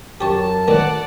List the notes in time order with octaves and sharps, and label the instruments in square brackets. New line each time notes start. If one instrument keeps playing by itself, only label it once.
[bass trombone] F#2 [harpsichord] G4 C#5 [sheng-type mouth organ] A5
[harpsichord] A2 D#3 B3 [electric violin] D5 F#5